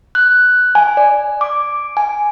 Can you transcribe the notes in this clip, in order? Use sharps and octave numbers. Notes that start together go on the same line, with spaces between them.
F#6
G#5
D5
D6
G#5